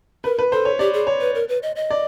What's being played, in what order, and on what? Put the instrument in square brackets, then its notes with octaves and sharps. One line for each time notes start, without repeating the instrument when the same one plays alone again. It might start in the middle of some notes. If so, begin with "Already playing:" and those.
[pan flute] A#4 [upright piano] B4
[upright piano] B4
[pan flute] A4 [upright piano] C5
[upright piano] C#5
[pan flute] G4 [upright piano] D5
[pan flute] G#4
[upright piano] C#5
[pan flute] B4
A#4
B4
D#5
D#5
[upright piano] D5